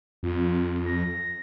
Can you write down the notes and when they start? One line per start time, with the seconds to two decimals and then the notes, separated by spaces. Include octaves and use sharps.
0.23 F2 F4
0.86 A#6